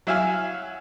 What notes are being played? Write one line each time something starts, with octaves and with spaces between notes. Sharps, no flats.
F#3 E4 E5 F5 G#5 F6